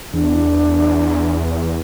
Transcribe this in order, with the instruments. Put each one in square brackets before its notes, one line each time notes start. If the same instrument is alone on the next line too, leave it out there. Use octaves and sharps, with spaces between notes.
[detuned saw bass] E2 [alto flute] D4